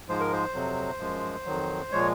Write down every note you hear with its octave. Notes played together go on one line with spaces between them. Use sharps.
G#2 F3 G#3 C5
A#4
C5
F2 C3 F#3
F#2 F3 G#3
F2 D#3 F#3
A#2 F3 G#3 C#5